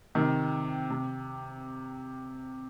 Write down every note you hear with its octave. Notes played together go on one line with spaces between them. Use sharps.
C3 D#3
C3